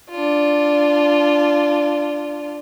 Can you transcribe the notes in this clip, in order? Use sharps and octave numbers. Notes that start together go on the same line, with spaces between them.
D4 F4